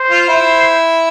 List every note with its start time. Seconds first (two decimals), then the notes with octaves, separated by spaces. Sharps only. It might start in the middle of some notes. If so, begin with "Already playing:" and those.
Already playing: C5
0.10 F4
0.28 E4